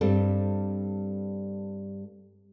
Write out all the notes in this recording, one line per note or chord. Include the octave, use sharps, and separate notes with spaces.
G2 G3 C4 A4